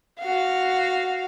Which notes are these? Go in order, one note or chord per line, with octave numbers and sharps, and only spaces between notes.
F#4 F5